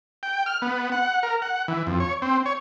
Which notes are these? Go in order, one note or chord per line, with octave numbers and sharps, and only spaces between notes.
G5
F6
B3
F#5
A#4
F#5
E3
F2
C#5
C4
C#5